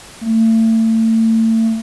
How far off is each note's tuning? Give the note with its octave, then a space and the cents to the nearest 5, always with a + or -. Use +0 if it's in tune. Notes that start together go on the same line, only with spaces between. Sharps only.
A3 +35